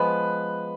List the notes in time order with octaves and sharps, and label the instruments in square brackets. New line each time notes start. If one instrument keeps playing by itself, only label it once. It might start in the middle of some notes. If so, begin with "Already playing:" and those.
Already playing: [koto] F3 G#3 B3 [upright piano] B4